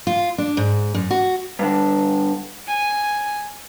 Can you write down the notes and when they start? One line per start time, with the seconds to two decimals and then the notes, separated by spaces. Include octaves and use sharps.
0.07 F4
0.38 D4
0.57 G#2
0.95 F#2
1.11 F#4
1.59 G2 D3
2.67 G#5